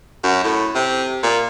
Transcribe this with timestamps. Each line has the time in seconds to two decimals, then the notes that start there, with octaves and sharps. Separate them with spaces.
0.24 F#2
0.44 A2
0.75 C3
1.23 A#2